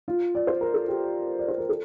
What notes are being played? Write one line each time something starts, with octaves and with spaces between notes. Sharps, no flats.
F4
D5
C5
A#4
A4
G4
D5
C5
A#4
A4